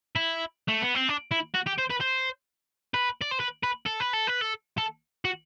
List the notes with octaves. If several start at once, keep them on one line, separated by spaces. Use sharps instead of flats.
E4
A3
B3
C4
D4
E4
F#4
G4
C5
B4
C5
B4
D5
C5
B4
B4
A4
B4
A4
B4
A4
A4
F#4